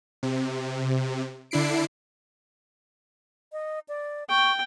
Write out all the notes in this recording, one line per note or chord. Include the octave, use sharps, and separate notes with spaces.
C3
D3 D4 E4 C7 D7
D#5
D5
G5 C#6